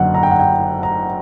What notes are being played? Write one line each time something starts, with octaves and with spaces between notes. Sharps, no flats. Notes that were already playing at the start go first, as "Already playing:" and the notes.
Already playing: F#1 F#2 D3 F#5
A#5
G5
F#5
G5
A#5